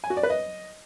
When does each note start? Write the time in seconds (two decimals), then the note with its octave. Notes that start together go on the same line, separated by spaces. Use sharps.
0.04 G#5
0.10 F#4
0.17 D5
0.23 B4
0.30 D#5